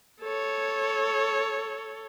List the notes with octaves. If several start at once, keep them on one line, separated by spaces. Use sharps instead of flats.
A4 C#5